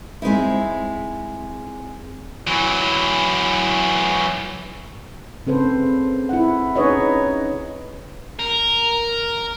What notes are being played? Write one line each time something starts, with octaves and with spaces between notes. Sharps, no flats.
G#3 C4 D#4 E4
E3 F#3
C#3 C4 A4 B4 C5
E4 F#5
C#4 D#4 G#4 B4 C#5 D#5
A#4